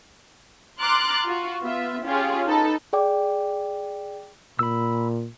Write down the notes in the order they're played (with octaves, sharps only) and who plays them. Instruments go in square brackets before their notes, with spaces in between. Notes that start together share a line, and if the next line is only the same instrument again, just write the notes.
[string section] A#5 C6 D6 F6 F#6 A6
F4 F#4
B3 F4 E5
C#4 F4 G4 G#4 C#5
D#4 A4 B4
[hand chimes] G#4 D5 G5 D6
[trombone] A#2 [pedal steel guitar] B5 E6